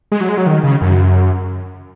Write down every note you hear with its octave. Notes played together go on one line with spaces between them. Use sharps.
G#3
F#3
G#3
F#3
D#3
C#3
F#2